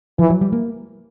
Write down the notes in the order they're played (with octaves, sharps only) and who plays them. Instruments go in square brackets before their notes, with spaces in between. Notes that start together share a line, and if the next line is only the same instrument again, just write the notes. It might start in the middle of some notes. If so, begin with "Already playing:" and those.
[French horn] E3 [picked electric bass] F3
[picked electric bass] F#3
G3
A#3